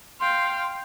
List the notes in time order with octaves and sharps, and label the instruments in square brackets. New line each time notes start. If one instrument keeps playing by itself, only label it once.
[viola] F5 G5 [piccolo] C6